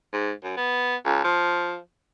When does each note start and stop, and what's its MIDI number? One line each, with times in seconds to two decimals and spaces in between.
0.13 0.32 44
0.44 0.57 42
0.57 0.96 59
1.05 1.21 37
1.24 1.78 53